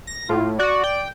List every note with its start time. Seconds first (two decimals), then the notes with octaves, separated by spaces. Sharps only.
0.07 A#6
0.29 A2 F4
0.59 F#4 D5
0.84 G5